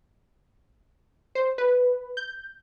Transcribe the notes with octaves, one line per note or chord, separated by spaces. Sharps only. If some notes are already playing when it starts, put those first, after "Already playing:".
C5
B4
G6